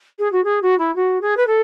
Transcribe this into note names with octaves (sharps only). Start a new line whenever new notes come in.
G#4
F#4
G#4
F#4
E4
F#4
G#4
B4
A4